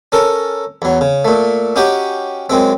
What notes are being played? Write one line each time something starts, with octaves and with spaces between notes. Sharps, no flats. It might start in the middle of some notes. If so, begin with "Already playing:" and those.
C#4 A4 A#4
E2 F#3
C#3
A#2 A3
C#4 D#4 F#4 G4 G5
F#2 G#3 C4